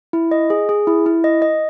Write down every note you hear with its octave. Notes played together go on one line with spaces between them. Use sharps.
E4
D#5
G#4
G#4
E4
E4
D#5
D#5